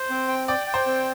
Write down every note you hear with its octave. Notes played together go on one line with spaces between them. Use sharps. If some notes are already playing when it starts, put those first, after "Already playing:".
Already playing: C5
C4
G5
D5 G5
G5
C5
C4